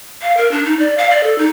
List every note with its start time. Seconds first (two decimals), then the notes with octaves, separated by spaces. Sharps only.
0.22 F5
0.37 A#4
0.51 D4
0.65 D#4
0.80 D5
0.98 F5
1.11 D5
1.23 A4
1.38 D#4